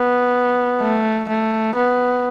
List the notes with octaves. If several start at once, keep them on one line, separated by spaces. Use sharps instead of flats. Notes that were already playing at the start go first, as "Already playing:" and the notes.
Already playing: B3
A3
A3
B3